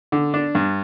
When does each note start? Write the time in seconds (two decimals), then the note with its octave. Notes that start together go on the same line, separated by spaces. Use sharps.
0.12 D3
0.34 D4
0.55 G2